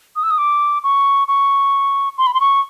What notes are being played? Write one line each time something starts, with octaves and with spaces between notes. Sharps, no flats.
D#6
E6
D#6
D6
C#6
C#6
C6
B5
C6
C#6